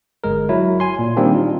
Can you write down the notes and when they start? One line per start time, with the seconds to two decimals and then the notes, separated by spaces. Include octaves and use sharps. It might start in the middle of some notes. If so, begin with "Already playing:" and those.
0.24 G1 G#3 A#4
0.49 F#3 E4
0.80 G#5 C6
0.99 A#2
1.17 D#3 G3 A#3 C4 D4
1.34 D#4 F4